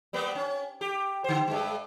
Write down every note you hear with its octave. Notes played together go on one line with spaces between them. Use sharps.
G3 A#3 B3
C#4
G4
D3 C5
G2 G#3